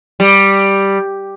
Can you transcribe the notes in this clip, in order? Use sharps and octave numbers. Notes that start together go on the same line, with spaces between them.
G3